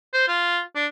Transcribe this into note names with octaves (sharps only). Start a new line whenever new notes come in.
C5
F4
D4